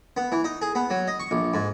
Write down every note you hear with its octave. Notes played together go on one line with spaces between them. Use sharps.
B3
E3
D#4
G#4
B3
F#3
D#5
C#6
A#1
G#2